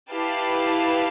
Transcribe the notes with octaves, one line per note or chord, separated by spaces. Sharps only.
E4 G4 B4 F5 A5